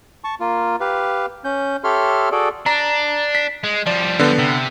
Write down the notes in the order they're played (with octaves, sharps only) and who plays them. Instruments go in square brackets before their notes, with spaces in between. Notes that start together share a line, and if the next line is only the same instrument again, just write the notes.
[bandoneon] A5 C#6
A#3 F4
G4 B4 F5
C#4 G6
G4 A4 C#5 E5 C6 F6
F#4 G#4 A4 D5
[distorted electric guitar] D4 [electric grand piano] A#5
[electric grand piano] B6
[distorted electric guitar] G#3
[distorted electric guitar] F3 G3 [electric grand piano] D5
[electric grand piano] D3 B3
[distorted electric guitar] C3